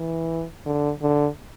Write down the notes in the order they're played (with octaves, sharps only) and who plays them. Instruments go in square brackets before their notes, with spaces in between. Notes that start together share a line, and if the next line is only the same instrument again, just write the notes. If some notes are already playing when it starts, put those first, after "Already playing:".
Already playing: [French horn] E3
D3
D3